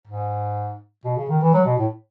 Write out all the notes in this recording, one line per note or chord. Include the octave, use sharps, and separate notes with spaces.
G#2
B2
C#3
D#3
E3
F#3
B2
A2